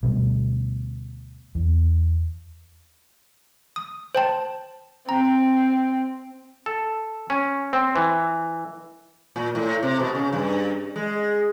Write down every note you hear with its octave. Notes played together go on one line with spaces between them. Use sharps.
D2 B2 G3
E2
D#6
C5 G5 A5
C4 A#5
A4
C#4
C4
E3
A#2
A2
C3
B2
C#3
G2
G#3